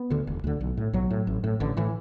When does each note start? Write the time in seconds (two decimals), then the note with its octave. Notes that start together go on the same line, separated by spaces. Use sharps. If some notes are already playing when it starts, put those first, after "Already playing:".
Already playing: B3
0.10 D2 D3
0.27 E1
0.44 D2 D3
0.61 B1
0.77 A2
0.93 B1 F#3
1.11 A2
1.27 A1
1.44 A2
1.60 A1 D3
1.77 A2 E3